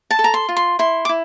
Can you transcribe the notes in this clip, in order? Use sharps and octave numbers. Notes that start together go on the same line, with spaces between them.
A5
A4
A#5
C6
F4
C6
E4 C6
D6
E4